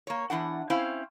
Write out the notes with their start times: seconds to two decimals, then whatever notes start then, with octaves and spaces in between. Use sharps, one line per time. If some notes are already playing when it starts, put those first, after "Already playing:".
0.07 A#3 C#5
0.30 E2 G#2 E3 D4 F#5
0.70 C4 C#4 E4 C5 F5